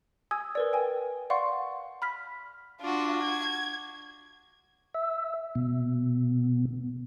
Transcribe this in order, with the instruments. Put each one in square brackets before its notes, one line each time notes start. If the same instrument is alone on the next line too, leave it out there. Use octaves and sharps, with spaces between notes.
[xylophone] G#5 D#6 E6 G#6
A#4 B4 D5
G5 G#5
D5 F5 F#5 C6 C#6
B5 F6 B6
[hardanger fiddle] D4 F#4 [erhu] F4
[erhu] G#6
[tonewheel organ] E5
B2